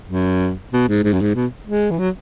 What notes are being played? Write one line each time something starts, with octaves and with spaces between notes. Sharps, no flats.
F#2
B2
G#2
G#2
F#2
G#2
B2
G#3
E3
F#3